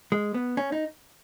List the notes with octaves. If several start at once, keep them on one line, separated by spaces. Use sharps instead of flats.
G#3
B3
C#4
D#4